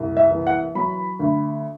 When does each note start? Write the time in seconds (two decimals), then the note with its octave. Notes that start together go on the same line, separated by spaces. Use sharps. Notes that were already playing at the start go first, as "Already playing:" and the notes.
Already playing: F#1 C2
0.17 E5
0.31 E3
0.47 F#5
0.75 F#3 B5
1.19 D2